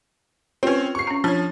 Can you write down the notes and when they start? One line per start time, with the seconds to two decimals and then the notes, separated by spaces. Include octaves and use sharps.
0.63 C4 C#4 F4 B4
0.95 C#6 C7
1.07 C#4 A#5
1.24 F3 D4 C#5